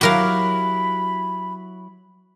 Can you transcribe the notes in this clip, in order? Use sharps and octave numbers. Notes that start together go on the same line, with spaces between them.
F#3 E4 F#4 G4 A#4 F5 B5